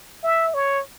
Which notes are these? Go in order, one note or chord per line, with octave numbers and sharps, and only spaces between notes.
E5
C#5